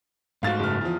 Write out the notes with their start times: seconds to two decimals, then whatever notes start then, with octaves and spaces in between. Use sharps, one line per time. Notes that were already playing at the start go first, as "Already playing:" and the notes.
0.43 G#2 A3 F#4 F5 A6
0.59 F#1 F6
0.81 E2 F3